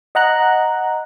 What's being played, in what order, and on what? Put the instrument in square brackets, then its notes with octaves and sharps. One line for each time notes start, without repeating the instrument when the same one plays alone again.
[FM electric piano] D#5 F#5 A#5 F#6